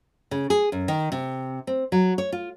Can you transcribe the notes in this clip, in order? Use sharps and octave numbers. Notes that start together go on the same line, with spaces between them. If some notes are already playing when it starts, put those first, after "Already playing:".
C#3
G#4
F#2
D#3
C3
C4
F#3
C#5
F4